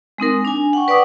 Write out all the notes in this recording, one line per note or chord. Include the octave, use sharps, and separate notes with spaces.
G#3 C4 D#4 A#4
D4 G#5
F#5 G5 C#6
B4 D5 F#5 G5 D6 D#6